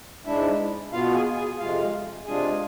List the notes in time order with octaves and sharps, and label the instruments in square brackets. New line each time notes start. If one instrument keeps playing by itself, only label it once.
[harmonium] G#2 G#3 D4 E4 E5
B2 B3 F4 F5
G#4 G#5
G#4 G#5
F2 C3 G#3 F4 F5
C3 G#3 D4 F4 G#4 G#5